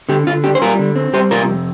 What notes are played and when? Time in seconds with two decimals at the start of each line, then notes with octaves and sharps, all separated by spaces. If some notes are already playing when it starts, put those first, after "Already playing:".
0.09 D3 G4
0.27 D3 F4
0.44 D4 G4
0.55 C5
0.62 G3 F4 A#4
0.79 D3
0.96 C4
1.13 G3 G4 C5
1.30 C3 F4 A#4
1.49 F2